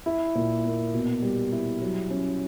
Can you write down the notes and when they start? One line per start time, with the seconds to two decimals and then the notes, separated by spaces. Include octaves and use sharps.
0.06 E4
0.35 A#2
0.65 A#3
0.94 B2
1.22 G3
1.52 E4
1.82 F#3
2.10 C#4